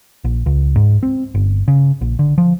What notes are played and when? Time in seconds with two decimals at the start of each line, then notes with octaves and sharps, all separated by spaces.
0.24 A#1
0.46 C#2
0.76 G#2
1.03 C4
1.34 G1
1.68 C#3
2.01 A#1
2.19 D3
2.38 F3